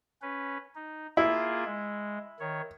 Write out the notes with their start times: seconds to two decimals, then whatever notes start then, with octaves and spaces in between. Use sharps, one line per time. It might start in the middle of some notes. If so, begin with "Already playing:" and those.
0.22 C#4 B4
0.75 D#4
1.17 A#3 E4 F4 G#4
1.66 G#3
2.40 D#3 C#5